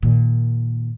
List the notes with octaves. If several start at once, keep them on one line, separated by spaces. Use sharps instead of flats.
A#2 D#3